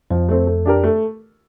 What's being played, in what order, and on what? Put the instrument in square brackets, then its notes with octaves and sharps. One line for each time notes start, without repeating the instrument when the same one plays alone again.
[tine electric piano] F2 [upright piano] F3
[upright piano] A3 C4
A3
D4 G4 A#4
A3